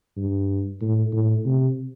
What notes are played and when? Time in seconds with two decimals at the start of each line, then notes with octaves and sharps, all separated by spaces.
0.17 G2
0.82 A2
1.13 A2
1.45 C3